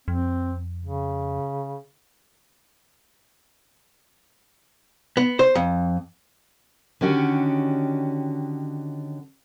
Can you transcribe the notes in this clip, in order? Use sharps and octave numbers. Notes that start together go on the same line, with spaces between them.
F2 C4
C#3
B3
C5
F2
D3 D#3 C#4 F#4 G4